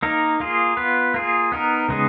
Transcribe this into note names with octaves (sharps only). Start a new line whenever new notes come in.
A#3 D#4 A#4
A#3 F4 G#4
B3 F4 B4
A#3 F4 G#4
B3 D#4 A#4
C#3 G#3 B3 D#4 G#4